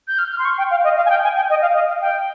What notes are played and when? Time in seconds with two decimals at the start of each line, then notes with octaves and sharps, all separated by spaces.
0.07 G6
0.18 F6
0.31 F6
0.38 C6
0.45 C#6
0.58 G5
0.70 F5
0.84 D#5
0.96 F5
1.05 G#5
1.10 G5
1.23 G#5
1.36 G5
1.49 D#5
1.61 F5
1.74 D#5
1.88 F5
2.01 G5